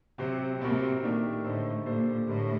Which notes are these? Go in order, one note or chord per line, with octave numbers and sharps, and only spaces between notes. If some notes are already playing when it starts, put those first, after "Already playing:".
C3 F#3 C4 G4 C5
C3 G3 C4 F#4 A#4
A#2 D#3 A3 D4 G4 A#4
A2 D3 A3 D#4 A4 C5
A#2 G3 D4 A4 C5
A2 D3 G3 A#3